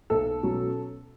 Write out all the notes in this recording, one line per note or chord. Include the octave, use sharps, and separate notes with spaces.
B1 A4
B2 F#3 C#4